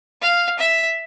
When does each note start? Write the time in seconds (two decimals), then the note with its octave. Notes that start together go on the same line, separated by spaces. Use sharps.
0.22 F5
0.59 E5